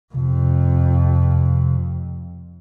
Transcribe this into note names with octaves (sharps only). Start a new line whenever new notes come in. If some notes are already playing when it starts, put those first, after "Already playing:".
F2 C3